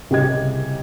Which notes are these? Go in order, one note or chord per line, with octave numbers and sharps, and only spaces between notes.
C2 C#3 G4 D#5 G#6